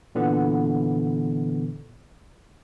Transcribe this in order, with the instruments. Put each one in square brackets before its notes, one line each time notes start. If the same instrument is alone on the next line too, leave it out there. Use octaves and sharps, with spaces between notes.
[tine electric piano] A#2 D3 E3 B3